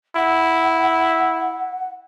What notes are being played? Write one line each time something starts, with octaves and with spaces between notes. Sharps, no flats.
E4 F#5